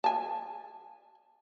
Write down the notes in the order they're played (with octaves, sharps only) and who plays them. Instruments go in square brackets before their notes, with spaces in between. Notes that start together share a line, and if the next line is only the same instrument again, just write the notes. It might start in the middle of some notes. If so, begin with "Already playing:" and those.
[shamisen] G#5 A5